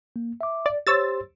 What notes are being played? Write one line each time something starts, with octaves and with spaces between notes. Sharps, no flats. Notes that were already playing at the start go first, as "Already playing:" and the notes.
A#3
E5 D6
D5
G4 C5 C#5 C6 E6 A6